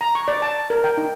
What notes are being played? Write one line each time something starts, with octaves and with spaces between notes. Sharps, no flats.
A#5
C#6
D5
A5
A#4
G5
D#4